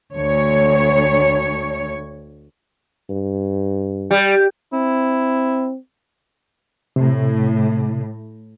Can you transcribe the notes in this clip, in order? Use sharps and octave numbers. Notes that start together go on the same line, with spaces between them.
D2 C#5
G2
G3
C4 E4
A2 C3